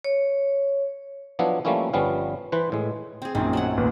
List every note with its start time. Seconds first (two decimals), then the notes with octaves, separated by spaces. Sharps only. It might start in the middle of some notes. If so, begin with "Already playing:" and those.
0.04 C#5
1.39 F3 F#3 B3 D4 E4
1.65 F3 G3 A3 A#3 C#4 E4
1.93 G1 F3 G3 B3 C#4 F5
2.52 E3 B4 C5
2.72 A2 G#3
3.22 C4 G#4
3.35 A#1 F#2 D#3 C4
3.53 F#3 A3 F#5
3.77 A1 D#2 B2